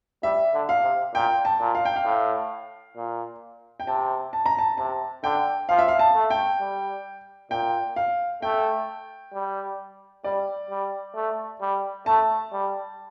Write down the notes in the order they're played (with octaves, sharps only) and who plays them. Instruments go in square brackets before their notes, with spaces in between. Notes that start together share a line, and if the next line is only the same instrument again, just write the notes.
[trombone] G3 [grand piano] E5
[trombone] D3
[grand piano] F5
[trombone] C3
[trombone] A#2 [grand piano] G5
[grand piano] A5
[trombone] A#2
[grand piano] F5
G5
F5
[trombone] A2
A#2
[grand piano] G5
[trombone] C3 [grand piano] A5
[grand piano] A5
A#5
A5
[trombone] C3 [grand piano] A5
[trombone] D3 [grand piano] G5
[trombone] F3 [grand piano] F5
[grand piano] E5
F5
A5
[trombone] A3
[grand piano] G5
[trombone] G3
[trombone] A#2 [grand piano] G5
[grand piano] F5
[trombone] A3 [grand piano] G5
[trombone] G3
[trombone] G3 [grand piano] D5
[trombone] G3
A3
G3
[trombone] A3 [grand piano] A5
[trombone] G3